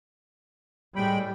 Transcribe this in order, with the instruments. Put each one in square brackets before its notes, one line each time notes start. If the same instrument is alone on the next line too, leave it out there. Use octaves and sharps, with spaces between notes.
[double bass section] A2 G3 [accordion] G#3 G5 B5